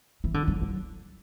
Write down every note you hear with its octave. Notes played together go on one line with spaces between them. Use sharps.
E3
D3
F#3
F#3